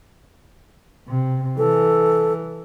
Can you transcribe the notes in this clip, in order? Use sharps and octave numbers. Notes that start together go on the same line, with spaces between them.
C3
E3 A4